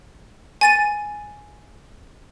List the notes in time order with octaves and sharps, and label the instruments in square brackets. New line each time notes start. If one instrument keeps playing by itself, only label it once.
[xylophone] G#5 A6 D#7